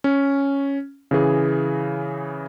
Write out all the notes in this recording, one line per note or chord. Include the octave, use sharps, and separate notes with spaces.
C#4
C#3 E3 G#4